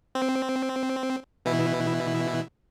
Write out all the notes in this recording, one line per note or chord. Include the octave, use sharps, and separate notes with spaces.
C4
B2 E3 E4